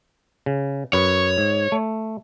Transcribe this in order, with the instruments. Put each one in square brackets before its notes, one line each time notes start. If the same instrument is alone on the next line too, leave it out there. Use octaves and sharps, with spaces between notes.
[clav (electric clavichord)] C#3
[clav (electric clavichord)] F#2 B4 [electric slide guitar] C#5
[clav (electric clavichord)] G#2
A3